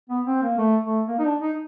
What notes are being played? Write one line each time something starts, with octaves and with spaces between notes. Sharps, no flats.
B3
C4
A#3
A3
A3
A#3
D#4
D4
D#4